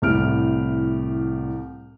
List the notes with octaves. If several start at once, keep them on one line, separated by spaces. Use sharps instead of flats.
C2 A2 F6 D7